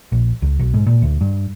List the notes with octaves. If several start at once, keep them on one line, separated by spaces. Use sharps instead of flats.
A#1
C#2
B1
G#2
A#2
D2
G2